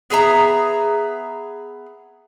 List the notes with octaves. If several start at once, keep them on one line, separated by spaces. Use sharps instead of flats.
B3 G#4 E5 A#5